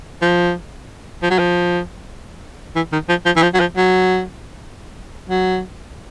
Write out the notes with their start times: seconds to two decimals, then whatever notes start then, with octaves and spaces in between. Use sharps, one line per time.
0.22 F3
1.23 F3
1.31 F#3
1.39 F3
2.76 E3
2.93 D#3
3.09 F3
3.26 F3
3.36 E3
3.43 F3
3.54 F#3
3.60 F3
3.77 F#3
5.30 F#3